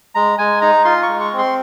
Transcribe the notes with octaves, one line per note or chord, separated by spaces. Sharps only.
G#3 A#5
G#3 G#5
D#4 A#5
F4 C6
C#6
G#3
C#6
C4
C6